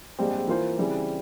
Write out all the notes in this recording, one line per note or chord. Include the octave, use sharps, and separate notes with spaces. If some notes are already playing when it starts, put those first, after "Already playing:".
A#1 G#2 G3 C4 G4
E3 A#3 F4 C5
C#3 E3 G3 C4